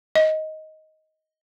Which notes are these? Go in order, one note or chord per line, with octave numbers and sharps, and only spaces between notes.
D#5